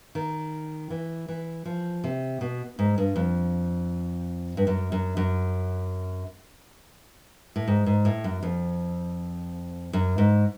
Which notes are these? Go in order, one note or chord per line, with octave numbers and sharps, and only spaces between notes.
D#3
E3
E3
F3
C3
B2
G#2
G2
F2
G2
F#2
F#2
F#2
A2
G#2
G#2
A2
F#2
F2
F#2
G#2